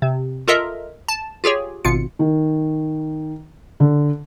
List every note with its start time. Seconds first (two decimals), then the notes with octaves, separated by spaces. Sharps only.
0.02 C3
0.48 F4 A4 A#4 D#5 E5
1.08 A5
1.44 F4 G4 G#4 C#5
1.85 G#1 B2 F4 C#7
2.19 D#3
3.80 D3